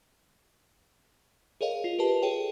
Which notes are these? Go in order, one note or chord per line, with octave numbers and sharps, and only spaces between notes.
G#4 A#4 C#5 D#5 F5
F4
G4 A#4 B4 A5
G#4 A4 C#5 G5